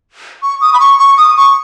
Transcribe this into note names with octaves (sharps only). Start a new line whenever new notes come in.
C#6
D#6
B5
C#6
C#6
D#6
C#6